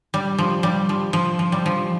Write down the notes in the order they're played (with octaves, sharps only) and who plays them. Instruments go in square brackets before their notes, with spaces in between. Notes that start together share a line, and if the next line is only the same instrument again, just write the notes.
[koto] G3
F3
G3
F3
F3
F3
G3
F3